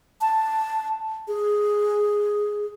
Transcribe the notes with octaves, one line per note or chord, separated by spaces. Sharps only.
A5
G#4